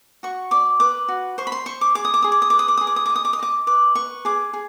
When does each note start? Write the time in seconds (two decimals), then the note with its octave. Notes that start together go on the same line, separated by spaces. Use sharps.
0.23 F#4 C#6
0.51 D5 D6
0.80 B4 D6
1.08 F#4
1.38 C5 C#6
1.47 B5
1.52 C6
1.66 C5 C#6
1.81 D6
1.95 G#4 D6
2.05 D#6
2.14 D6
2.22 G#4 D#6
2.32 D6
2.42 D#6
2.50 B4 D6
2.59 D#6
2.68 D6
2.77 G#4 D#6
2.87 D6
2.96 D#6
3.06 D#5 D6
3.16 D#6
3.25 D6
3.33 D#6
3.39 D#5 D6
3.67 B4 D6
3.95 B4 C#6
4.25 G#4 D6
4.53 G#4